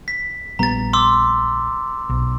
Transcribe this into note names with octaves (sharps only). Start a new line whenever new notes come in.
B6
A#1 G3 B3 A#5 A6
C6 D6 E6
B1